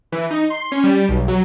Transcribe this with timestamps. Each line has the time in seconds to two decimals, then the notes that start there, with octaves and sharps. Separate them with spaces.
0.12 E3
0.31 D#4
0.50 C6
0.72 C#4
0.84 G3
1.09 B1
1.28 F#3